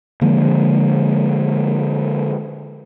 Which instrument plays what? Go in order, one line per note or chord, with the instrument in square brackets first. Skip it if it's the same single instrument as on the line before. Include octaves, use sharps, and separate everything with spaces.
[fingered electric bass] D3 F3 G#3 A#3